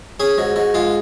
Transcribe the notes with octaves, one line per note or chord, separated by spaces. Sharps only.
C#4 G#4
G#2 F#4
G#2 F#4
G#3 F4